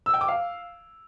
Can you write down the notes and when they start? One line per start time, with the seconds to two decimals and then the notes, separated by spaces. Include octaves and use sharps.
0.06 E6
0.14 G5
0.21 D6
0.28 F5